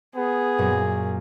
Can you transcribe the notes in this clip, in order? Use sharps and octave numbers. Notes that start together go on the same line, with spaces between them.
B3 G#4
F#2 A#2